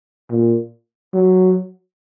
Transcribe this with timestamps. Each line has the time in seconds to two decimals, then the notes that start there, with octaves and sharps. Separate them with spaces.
0.31 A#2
1.14 F#3